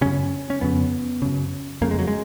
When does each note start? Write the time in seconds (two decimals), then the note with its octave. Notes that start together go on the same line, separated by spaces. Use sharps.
0.01 F#2 C#3 C#4
0.50 C#4
0.61 F2 C#3 B3
1.22 F#2 C#3
1.81 F2 C#3 A#3
1.91 G#3
1.99 F#3
2.08 G#3